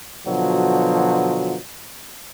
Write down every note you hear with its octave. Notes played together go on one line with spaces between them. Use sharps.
B2 D3 F3 F#3